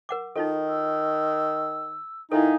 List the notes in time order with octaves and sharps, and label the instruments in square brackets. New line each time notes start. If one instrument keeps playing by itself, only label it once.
[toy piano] A#4 F#5 D6
[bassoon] D#3 [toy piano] D#4 F4 A4
[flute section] E6
[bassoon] D#3 [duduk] D#4 [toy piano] E4 A4 [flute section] E5 F5 G#5